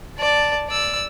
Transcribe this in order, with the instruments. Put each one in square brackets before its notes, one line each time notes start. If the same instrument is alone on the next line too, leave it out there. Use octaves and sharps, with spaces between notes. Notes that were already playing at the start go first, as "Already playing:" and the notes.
[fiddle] D5 A5
D5 E6